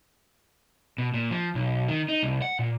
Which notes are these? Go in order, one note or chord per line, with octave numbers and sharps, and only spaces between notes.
B2
A#2
F3
B1
D#3
D#4
C2
F#5
A#2